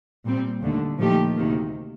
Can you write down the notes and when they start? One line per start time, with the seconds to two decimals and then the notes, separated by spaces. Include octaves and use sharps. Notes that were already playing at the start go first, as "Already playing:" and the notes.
0.25 A#2 G3 C4
0.61 D#2 D3 A3
0.98 A#2 F3 A3 D#4 G4
1.36 D2 C3 D#3 A#3